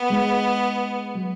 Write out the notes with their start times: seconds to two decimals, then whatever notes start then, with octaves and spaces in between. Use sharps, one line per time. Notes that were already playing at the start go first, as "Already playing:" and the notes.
Already playing: B3
0.10 G#3
1.15 F#3